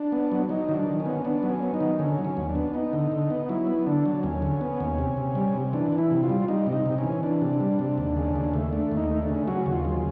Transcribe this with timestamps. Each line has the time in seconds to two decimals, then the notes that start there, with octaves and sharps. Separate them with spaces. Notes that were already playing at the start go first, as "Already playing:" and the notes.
Already playing: D4
0.12 B3
0.32 F#3
0.49 F#3 D#4
0.69 D#3
0.74 D4
0.87 D#3
1.00 C#4
1.06 B3
1.25 B3 D4
1.43 F#3
1.49 C#4
1.62 B3
1.74 D#4
1.80 D#3
1.99 D3 C#4
2.18 F#3
2.25 C#4
2.37 D#2
2.49 D4
2.55 B3
2.74 B3 D#4
2.93 D3
3.12 D3
3.30 B3
3.49 F#3 E4
3.67 B3
3.86 D3 D4
4.06 F#3
4.23 D#2 C#4
4.42 D3
4.61 B3
4.80 D#2
4.98 C3
5.17 C3
5.35 G3
5.55 C3
5.73 E3 D4
5.92 E3
5.98 E4
6.11 C3
6.23 F4
6.29 G3
6.48 G3 D#4
6.67 C3
6.73 D#4
6.86 C3
6.98 C#4
7.04 E3
7.23 E3 D4
7.41 C3
7.60 G3
7.79 C3
7.98 D#2
8.16 C#3
8.36 D#2
8.54 A3
8.73 A3 D4
8.91 D#2
8.97 D#4
9.10 A3
9.22 D4
9.29 C#3
9.47 F#3 F#4
9.66 D#2
9.72 F4
9.85 C#3